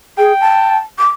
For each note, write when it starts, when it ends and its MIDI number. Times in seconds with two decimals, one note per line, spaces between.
0.18 0.32 68
0.18 0.78 79
0.40 0.77 81
0.98 1.09 86